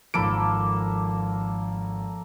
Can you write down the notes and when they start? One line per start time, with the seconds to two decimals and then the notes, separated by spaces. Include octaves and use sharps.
0.14 G#1 F3 A#3 A4 B5 D7